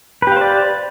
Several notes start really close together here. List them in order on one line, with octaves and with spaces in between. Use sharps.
B4 G4 F5 C5 D5